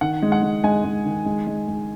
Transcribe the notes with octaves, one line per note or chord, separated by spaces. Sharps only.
D#3 F#5
G#3
F#5
G#3
G#3 G#5
G#3
D#3
G#3
G#3
G#3